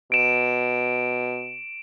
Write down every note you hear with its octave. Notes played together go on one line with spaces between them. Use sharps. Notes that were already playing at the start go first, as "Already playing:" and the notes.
B2 D7 E7